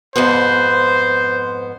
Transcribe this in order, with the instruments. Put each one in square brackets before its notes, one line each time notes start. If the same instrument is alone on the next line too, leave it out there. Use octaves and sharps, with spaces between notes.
[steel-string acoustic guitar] F2 G#2 B3 [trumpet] C5